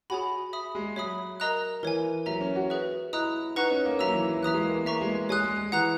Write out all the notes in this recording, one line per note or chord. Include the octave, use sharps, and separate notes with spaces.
F#4 G#4 C#5 G#5 B5
E5 B5 D#6
G#3
F#3 C#5 E5 B5 D#6
A#4 D#5 A#5 D#6 F#6
E3 A#4 C#5 G#5
F#3 A#4 E5 A#5
C#4
F#4
G#4 B4 E5
E4 D#5 A#5 D#6 F#6
D#4 B4 F#5 A#5 C#6 F#6
C#4
A#3
F#3 E5 A#5 E6
E3
F#3
E3 E5 A#5 D#6 F#6
G#3
A#3
B3
A#3 E5 A#5 C#6
G#3
G#3
G#3 C#5 G#5 D#6 F#6
G#3
G#3
E3 F#5 A#5 D#6 F#6